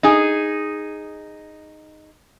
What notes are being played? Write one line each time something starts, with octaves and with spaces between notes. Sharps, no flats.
D#4 G#4